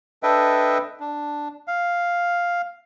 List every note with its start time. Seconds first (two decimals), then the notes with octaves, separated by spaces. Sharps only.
0.23 D4 A4 B4 D#5 E5 G5
1.00 D4
1.68 F5